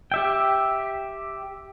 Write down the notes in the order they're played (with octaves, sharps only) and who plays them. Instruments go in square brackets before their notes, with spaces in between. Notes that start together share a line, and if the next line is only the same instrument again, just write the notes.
[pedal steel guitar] G4 E5 G5